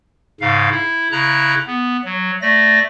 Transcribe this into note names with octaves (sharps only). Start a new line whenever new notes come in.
G#2 C#3 F5
E4
C#3 E4 A#5 F#6
B3
F#3
A3 D5 A#6